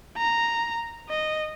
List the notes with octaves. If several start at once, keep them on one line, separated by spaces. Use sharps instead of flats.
A#5
D#5